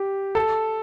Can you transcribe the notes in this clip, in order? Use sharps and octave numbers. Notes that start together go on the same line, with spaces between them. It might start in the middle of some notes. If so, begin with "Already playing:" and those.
Already playing: G4
A4